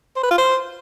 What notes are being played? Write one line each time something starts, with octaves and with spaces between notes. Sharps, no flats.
C5
B4
F4
C5